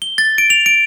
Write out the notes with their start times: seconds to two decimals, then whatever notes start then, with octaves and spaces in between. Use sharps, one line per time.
0.02 G7
0.18 A6
0.38 D7
0.50 F7
0.66 D7